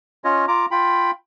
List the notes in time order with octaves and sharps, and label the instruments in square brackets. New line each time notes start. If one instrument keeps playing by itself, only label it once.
[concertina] C#4 F4 C#5 D#5
F4 A#5 D6
F4 G5 B5